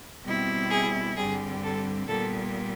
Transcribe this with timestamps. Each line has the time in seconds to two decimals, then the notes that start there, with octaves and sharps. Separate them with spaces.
0.24 B2 G3 C4 E4
0.70 G#4
1.16 G2 D3 G3 C4 G#4
1.63 A4
2.08 A#2 G3 B3 A4